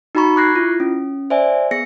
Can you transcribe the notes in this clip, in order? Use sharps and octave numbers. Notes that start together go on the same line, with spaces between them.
D#4 F#4 A#5 B5 C#6
C#6 D6 F#6 G#6 A#6 C7
E4 F4
C#4
C5 D5 E5 G#5
B3 G#4 A#6 C#7